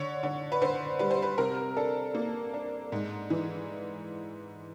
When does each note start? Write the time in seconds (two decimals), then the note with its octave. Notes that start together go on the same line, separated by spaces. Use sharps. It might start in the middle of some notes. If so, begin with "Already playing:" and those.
Already playing: D3 C#5
0.23 D3
0.52 B4
0.62 D3 C5
0.99 G3 B4
1.11 C5
1.22 B4
1.38 C3 A#4
1.77 D4 A4
2.15 A#3
2.54 D4
2.92 G#2
3.30 E3